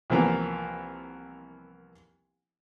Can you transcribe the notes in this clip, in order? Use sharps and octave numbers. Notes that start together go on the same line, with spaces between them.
C2 E3 F3 A#3 B3